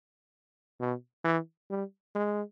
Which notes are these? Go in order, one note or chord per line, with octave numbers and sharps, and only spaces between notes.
B2
E3
G3
G#3